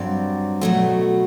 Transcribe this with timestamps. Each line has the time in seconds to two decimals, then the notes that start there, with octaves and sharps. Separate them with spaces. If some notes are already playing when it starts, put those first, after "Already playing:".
Already playing: G2 F#3 C4 D5
0.61 B2 F#3 A3